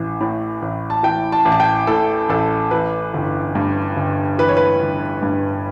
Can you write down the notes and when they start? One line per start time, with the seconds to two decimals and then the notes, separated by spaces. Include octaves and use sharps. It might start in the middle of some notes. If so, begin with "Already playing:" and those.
Already playing: A1 E3
0.21 A2
0.62 A1
0.90 A5
1.03 E3 G5
1.32 A5
1.45 A1
1.52 A5
1.60 G5
1.87 A2 A4
2.29 A1 A4
2.71 E3 B4
3.14 G1
3.55 G2
3.97 G1
4.39 E3 B4
4.49 C#5
4.57 B4
4.81 G1
5.22 G2